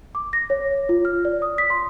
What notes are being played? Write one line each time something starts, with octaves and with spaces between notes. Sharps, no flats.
D6
A#6
C#5
F4
F6
D5
D#6
B6
C6